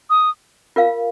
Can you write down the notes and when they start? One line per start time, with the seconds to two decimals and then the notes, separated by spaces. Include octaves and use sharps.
0.10 D#6
0.76 F4 A#4 F5